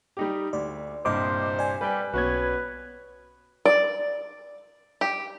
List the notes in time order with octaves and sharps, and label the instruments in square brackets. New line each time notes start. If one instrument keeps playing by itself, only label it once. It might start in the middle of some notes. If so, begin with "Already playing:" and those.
[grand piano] G3 D#4 G4
[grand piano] D2 [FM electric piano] D5
[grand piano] C2 G2 A#2 [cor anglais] C5 [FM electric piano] D#5 C6 D6
[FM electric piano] D5 G#5
[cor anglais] G3 [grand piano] B4 G5
[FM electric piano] B1 G#6 [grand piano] B3 C#4 F#4 [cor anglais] B4
[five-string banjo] D5
G4